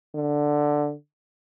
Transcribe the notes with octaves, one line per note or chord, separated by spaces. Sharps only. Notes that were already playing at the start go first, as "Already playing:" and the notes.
D3